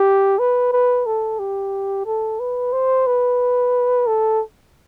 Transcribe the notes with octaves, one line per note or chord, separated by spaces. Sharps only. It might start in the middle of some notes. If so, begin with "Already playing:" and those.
Already playing: G4
B4
B4
A4
G4
A4
B4
C5
B4
A4